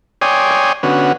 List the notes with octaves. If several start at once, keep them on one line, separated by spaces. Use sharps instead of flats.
C#5 D5 G5 G#5 C6 D#6
D3 B3 C#4 F#4